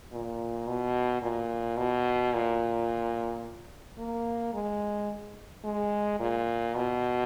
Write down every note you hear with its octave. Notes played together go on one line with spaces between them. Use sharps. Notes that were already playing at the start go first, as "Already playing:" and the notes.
A#2
B2
A#2
B2
A#2
A#3
G#3
G#3
A#2
B2